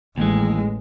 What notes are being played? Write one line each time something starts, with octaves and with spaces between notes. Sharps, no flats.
A1 D#2 E3 G#3